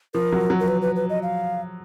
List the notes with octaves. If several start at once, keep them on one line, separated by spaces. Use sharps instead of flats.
F3 A#4
F#3
F#3
A#4
B4
B4
B4
D#5
F5